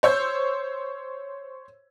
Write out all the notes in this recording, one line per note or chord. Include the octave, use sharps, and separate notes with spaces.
C5 C#5 E6 G6